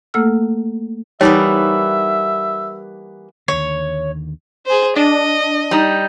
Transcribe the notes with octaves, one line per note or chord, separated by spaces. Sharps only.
A3 A#3 A4 F#5 E6 F6
E3 G3 A#3 B3 D#4 C#5 E5
D#2 D3 C#5
G#4 C5
D4 D#5
G3 D#4